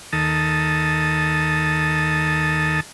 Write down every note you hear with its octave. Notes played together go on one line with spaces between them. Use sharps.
D#2 D#3 A4 A5 D#6